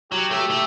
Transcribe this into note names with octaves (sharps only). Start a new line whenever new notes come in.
F#3 G4
A3
A3